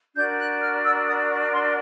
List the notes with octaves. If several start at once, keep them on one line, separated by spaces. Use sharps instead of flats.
D4 F#4 A#4 G6
F#6
F6
E6
D#6
C#6
C6